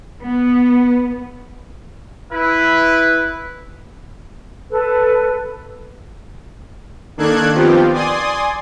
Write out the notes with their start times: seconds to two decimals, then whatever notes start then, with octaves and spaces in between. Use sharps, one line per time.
0.22 B3
2.32 E4 B4
4.70 A4 B4
7.17 D#3 A#3 D4 A4 F#6 G#6
7.52 D#3 F3 B3 C4 F4 G4
7.93 D5 G#5 C6 D#6